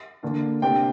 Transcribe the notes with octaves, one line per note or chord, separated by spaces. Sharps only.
D3 A#3 D4
C3 A#3 D4 G5